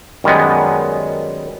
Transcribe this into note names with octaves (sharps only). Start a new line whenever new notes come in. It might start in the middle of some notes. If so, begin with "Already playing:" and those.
F#2 D#3 G3 G#3 B3